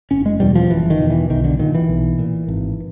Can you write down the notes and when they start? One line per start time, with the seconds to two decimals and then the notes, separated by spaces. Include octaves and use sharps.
0.11 F#1 C#4
0.26 G#3
0.40 E2 B2 G3
0.55 F3
0.70 F#1 E3
0.90 D#3
1.00 E2 B2
1.10 E3
1.30 B1 D#3
1.44 D3
1.59 A#2 D#3
1.75 E3
1.89 B1
2.19 A#2
2.48 G#1